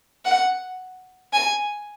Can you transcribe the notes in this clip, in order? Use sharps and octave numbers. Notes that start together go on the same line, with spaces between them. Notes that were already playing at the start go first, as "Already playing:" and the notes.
F#5
G#5